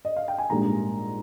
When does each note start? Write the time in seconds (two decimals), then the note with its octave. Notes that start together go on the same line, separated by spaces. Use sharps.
0.05 D#5
0.16 F5
0.28 G5
0.38 G#5
0.50 A#1 G#2 G3 A#3 A#5